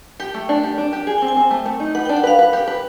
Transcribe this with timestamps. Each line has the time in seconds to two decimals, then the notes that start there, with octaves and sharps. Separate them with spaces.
0.20 G4 G5
0.34 A3
0.49 D4
0.63 G4
0.78 D4
0.93 G4
1.07 G#4 G#5
1.18 G5
1.22 C4
1.28 G#5
1.36 C4 G5
1.51 A3
1.66 A3
1.80 D#4
1.95 B4 F#5
2.05 G5
2.09 D4
2.17 F#5
2.23 B4 F5
2.39 B4
2.53 G4
2.67 B4